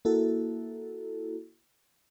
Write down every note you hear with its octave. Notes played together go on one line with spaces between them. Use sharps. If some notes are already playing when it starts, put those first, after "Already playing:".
A#3 E4 F#4 A4